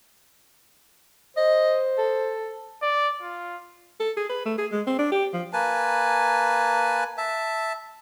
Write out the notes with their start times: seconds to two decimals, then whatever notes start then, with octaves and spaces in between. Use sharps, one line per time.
1.37 C5 D#5
1.98 A4
2.83 D5
3.22 F4
4.00 A4
4.17 G#4
4.29 B4
4.45 A3
4.58 G#4
4.71 G#3
4.87 C4
4.98 D4
5.12 G4
5.33 F3
5.53 A#3 B4 G#5 A5
7.18 E5 A5